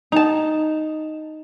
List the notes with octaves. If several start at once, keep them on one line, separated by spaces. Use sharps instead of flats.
D#4 A5